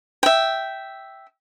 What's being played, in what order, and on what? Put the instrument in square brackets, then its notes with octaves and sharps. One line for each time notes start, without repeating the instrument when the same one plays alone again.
[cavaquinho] E5 G5